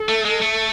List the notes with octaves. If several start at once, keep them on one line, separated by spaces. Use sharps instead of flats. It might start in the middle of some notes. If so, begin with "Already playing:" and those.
Already playing: A4
A3
G#3
A3